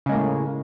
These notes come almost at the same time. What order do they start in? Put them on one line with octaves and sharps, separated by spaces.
C#3 G#3 A#3 A2